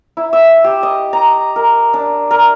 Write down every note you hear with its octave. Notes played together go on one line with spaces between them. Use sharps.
E4
E6
G4
D#5
A#5
A#4
D4
A#4